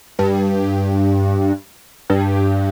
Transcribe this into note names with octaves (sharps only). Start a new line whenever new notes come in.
G2
G2